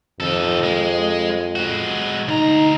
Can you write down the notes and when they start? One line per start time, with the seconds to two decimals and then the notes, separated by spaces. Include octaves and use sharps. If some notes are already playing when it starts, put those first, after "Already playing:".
0.20 F2 D#3 A4
0.63 G#3
1.56 G#3 F#4
2.28 D2 D#4 A#5